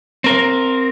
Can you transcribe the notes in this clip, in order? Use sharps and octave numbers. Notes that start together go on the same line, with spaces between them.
C4 A#4